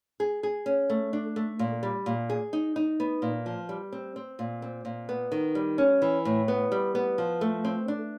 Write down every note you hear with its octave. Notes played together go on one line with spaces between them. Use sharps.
G#4
G#4
C#4
A3
D4
A3
A#2
G3
A#2
G#4
D#4
D#4
B3
A#2
F3
G3
C4
C4
A#2
C4
A#2
B3
D#3
G3
C#4
E3
A2
B3
G3
B3
F3
A3
C4
D4